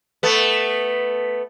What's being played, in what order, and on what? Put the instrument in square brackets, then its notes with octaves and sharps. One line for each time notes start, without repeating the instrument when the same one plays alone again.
[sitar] A3 B3